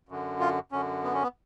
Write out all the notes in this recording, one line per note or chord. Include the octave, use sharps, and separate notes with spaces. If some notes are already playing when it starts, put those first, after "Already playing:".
F#2 D3
F4
F#2 D3 C#4
B3
C#4
B3